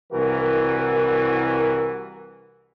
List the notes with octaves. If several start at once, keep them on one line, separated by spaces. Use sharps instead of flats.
C2 E3 F#4 A#4